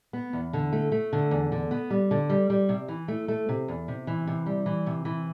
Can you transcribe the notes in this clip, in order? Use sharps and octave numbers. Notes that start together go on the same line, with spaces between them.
B3
E2
D3
A3
A3
D3
E2
D3
B3
G3
D3
G3
G3
C3
E3
A3
A3
C3
E2
C3
E3
C3
G3
E3
C3
E3